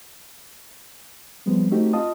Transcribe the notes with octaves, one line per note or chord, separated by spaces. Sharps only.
F3 G3 G#3 B3 C4
A3 C4 D#4 F#4 G4
F4 D#5 F5 A5 D#6